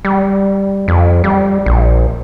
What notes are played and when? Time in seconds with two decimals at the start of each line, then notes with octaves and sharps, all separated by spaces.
0.05 G3
0.88 F2
1.24 G3
1.66 A#1